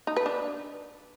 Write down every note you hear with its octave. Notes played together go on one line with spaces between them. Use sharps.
D#4
B4
D4